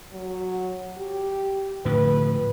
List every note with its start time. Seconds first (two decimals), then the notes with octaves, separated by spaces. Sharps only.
0.12 F#3
0.97 G4
1.85 A2 D3 F3 B4